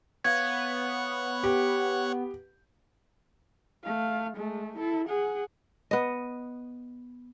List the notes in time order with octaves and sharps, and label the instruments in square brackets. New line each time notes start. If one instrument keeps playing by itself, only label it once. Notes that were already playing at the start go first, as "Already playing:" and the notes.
[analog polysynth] B3 [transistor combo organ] C#5 F#5 [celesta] F5 G#6
[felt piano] G4
[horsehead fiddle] A3 F5
G#3 A3
E4 A4
G#4 F#5
[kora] B3 D#5